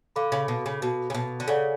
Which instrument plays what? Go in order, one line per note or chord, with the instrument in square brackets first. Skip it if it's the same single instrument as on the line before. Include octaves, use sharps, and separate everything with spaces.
[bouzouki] D3 [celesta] A4 F5 B5 D6
[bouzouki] C#3
B2
C#3
B2
C#3
B2
D3
[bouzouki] C#3 [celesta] A4 D5 F#5